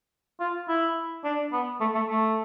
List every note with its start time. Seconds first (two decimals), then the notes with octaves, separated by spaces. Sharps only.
0.40 F4
0.68 E4
1.24 D4
1.52 B3
1.81 A3
1.95 A3
2.09 A3